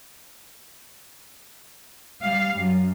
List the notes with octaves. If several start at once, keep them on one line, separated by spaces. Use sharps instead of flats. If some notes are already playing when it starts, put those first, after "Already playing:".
G3 F5
F#2